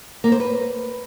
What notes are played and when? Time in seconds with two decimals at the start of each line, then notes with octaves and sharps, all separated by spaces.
0.24 A#3
0.32 C5
0.40 B4